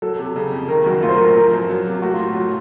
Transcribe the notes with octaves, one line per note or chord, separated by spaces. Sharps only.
F#3 A4
C3
C#3
F2
D#3 A#4
F#2 F#4
A3 F4
C5
A#4
A2
A#4
F3 A#4
F#2
F#3
C3
A3 F#4
F4
A2
F#3